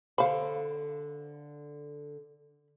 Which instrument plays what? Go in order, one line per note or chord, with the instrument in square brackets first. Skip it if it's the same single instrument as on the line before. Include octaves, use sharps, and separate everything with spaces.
[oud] D3 C5 [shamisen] F5 B5